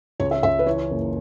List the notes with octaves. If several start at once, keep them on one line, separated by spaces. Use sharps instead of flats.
C#2 C#5
E5
C#2 E5
B4
E3 C#5
F#1